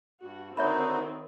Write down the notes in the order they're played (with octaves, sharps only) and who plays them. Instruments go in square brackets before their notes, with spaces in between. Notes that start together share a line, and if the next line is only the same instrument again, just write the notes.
[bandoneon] G2 [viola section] F#4
[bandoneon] D3 D#4 F#4 [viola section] D#3 C4 [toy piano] C#5 E5 B5